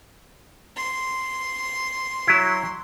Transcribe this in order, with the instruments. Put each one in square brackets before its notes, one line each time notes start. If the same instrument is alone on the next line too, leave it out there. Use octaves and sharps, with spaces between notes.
[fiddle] C6
[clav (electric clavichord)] F#3 E4